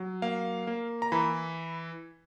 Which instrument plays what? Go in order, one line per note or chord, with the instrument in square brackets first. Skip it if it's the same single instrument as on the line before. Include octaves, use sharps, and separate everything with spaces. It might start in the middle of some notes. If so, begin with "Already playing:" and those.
Already playing: [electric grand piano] F#3
A#3 F5
A#3
A#5
E3 B5